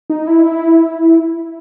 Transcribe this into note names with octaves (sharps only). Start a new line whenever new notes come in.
D#4
E4